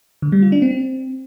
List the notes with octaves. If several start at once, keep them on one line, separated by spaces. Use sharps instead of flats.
D3
G3
F4
D4
C4